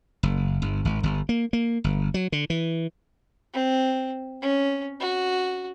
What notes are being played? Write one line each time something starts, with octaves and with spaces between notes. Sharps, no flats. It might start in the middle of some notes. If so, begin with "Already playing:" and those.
F#1
G1
G#1
G1
A#3
A#3
G1
F#3
D3
E3
C4
C#4
F#4